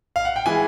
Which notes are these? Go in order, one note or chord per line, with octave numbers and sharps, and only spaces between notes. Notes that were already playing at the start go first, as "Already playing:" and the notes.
F5
F#5
G5
E3 G#3 G#5